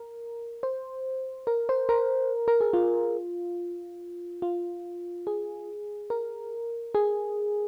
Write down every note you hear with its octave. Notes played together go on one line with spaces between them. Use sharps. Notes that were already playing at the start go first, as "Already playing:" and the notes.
Already playing: A#4
C5
A#4
C5
A#4
A#4
G#4
F4
F4
G#4
A#4
G#4